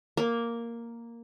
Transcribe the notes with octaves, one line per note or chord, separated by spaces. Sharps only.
A#3